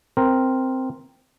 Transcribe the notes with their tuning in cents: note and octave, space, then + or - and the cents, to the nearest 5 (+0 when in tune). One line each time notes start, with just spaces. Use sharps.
C4 +0 A#4 +0